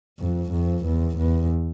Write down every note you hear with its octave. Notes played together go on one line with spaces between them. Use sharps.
F2
F2
E2
E2